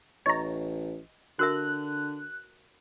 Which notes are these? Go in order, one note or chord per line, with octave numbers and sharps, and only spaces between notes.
A1 C#5 D#5 A#5
D3 F#4 A#4 E5 F#6